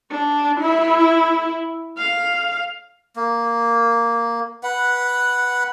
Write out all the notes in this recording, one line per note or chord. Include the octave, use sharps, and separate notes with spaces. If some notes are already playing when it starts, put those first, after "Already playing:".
D4
E4
F5
A#3
B4 F#5